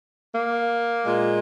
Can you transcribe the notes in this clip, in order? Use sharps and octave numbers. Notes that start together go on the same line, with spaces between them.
A#3
A#2 G#3